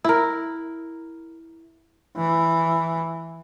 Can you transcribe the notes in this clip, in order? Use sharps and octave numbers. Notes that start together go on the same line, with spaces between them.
E4 A#4
E3